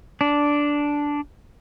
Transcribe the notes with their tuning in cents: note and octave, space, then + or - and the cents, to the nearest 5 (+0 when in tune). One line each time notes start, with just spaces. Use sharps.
D4 -5